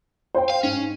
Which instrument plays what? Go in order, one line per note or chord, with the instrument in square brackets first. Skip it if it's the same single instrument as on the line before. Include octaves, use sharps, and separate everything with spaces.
[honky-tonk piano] C5 G5
[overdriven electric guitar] F5
[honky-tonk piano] G#2 [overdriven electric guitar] C#4